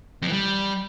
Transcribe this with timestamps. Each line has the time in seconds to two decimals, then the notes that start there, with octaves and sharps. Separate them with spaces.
0.22 F2
0.27 E3
0.32 G3